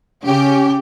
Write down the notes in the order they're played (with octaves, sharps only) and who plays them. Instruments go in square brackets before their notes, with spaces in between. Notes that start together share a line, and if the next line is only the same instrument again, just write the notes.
[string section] C#3 G4 [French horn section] C#4